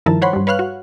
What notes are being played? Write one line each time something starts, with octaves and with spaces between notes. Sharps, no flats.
G2 D#3 F3 E4 A#4 A5
C5 C#5 F#5 B5 C6
G2 G3
B4 C#5 F5 F6 F#6
F#4